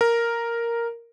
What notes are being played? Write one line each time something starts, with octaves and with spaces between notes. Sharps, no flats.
A#4